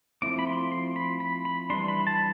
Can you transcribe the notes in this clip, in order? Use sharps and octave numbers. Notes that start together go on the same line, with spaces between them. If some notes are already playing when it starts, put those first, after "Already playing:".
F3 A3 C4 E4 D6
B5
C6
C6
B5
B5
B5
E3 G3 D4 C6
B5
A5